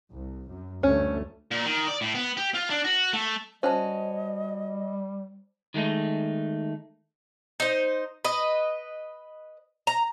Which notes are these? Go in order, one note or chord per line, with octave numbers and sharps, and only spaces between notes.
C2
F#2
D2 G2 A3 C#4
A#2
D#3
D5
A2
B3
G4
F4
D4
F#4
A3
G3 C#4 F#4 C5 D#5 A5
D#3 G#3 A3 D#4
D#4 C5
B4 D#5
A#5